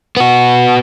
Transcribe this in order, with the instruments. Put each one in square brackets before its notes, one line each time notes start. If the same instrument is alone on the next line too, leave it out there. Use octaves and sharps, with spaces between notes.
[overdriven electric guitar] B3 F#4